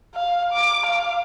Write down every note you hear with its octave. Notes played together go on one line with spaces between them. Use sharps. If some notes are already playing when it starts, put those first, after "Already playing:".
F5
D6
F5